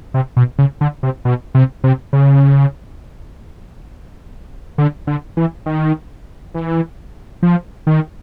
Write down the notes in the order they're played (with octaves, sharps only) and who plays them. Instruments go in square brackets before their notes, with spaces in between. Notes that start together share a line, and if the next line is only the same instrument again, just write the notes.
[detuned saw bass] C3
B2
C#3
D3
C3
B2
C3
C3
C#3
D3
D3
E3
D#3
E3
F3
D#3